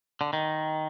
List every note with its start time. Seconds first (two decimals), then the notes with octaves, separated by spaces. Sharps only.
0.21 D3
0.33 D#3